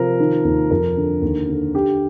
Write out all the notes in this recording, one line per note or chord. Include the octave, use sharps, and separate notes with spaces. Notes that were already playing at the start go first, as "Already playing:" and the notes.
Already playing: C3 F3 A#4
D#3
D#2
F2 A#4
D3
D#2
D3
D3 G4